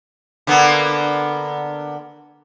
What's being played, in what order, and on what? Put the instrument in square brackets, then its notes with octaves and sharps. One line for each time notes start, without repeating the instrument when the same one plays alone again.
[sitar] D3 A#3 B3